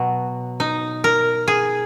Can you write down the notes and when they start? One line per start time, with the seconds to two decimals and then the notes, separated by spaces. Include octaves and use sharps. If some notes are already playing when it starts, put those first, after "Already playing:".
Already playing: B2 F#3
0.60 D#4
1.04 A#4
1.48 G#4